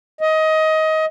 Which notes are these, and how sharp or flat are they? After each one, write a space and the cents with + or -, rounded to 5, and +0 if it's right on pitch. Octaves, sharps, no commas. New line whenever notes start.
D#5 +20